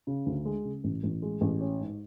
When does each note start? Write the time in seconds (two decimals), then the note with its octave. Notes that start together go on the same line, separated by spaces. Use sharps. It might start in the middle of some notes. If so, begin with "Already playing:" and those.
0.07 C#3
0.26 D2
0.45 G#3
0.65 C#3
0.84 A1
1.03 A1
1.22 G#3
1.41 A1
1.61 C#4
1.80 G#2